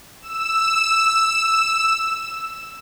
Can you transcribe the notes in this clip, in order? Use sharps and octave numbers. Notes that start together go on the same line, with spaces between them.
E6 E7